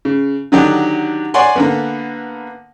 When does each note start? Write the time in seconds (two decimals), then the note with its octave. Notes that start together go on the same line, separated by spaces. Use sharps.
0.05 C#3
0.52 D3 D#3 F#3 D4 D#4 G4
1.34 C#5 D5 F#5 G#5 C6
1.56 D3 A#3 B3